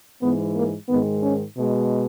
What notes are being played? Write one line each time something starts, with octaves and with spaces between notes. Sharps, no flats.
G#2 E3 G#3 B3
A#3
G#2 D#3 G#3 B3
C#4
B2 G#3